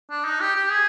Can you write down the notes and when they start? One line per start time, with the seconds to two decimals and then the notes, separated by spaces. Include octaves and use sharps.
0.10 D4
0.24 D#4
0.40 G4
0.56 G4
0.70 G#4